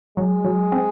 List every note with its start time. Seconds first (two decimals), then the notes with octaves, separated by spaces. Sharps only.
0.17 F#3 G#3
0.45 F#3
0.72 C4